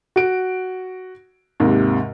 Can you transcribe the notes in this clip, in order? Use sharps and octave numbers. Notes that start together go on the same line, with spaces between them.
F#4 D7
D#2 G#2 C3